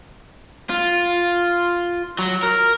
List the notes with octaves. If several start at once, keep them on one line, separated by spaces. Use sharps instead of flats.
F4
F#3
A#4